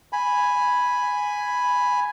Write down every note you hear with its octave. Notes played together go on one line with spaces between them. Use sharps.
G#5 B5